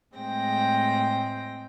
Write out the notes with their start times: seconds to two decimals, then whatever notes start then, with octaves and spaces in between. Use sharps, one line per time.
0.15 A2 G#3 C4 G5 A#6